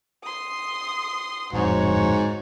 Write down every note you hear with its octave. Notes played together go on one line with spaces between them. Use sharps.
C6 D#6
D1 F2 G#2 D3 F#4 C#5